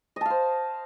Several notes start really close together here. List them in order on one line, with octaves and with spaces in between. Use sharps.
D#5 A5 F5 C5